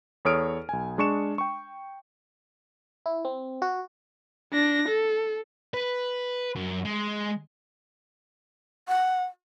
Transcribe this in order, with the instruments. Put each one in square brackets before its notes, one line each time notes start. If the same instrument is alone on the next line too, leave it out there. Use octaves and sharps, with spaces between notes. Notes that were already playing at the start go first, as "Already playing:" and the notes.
[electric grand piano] E2 A4 C#5 D#6 F6 D7
B1 G#5
G#3 D4 C#6 C#7 E7
G5 C#6
[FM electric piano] E4
C4
F#4
[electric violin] D4 A#6
A4
[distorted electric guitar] B4
F#2
G#3
[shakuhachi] F#5